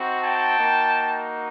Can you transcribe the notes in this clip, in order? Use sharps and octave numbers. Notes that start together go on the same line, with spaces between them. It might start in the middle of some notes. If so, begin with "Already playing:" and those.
Already playing: C4 D#4 F#4
G5 A5
A#3 D#4 F#4